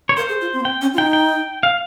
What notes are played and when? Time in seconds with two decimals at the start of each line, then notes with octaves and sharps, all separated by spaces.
0.09 C#5
0.17 A#4 C5
0.29 G#4
0.41 F4
0.53 C4
0.60 A#3
0.65 C4 G5
0.81 C#4
0.94 F4
0.98 D#4 G5
1.13 G5
1.63 F5